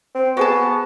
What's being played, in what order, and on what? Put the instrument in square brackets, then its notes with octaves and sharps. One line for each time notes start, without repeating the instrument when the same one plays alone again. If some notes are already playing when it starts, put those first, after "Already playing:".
[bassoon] C4
[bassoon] B3 [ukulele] F#4 G#4 A5